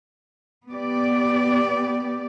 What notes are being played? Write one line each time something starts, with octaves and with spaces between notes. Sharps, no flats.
B3 G4 D5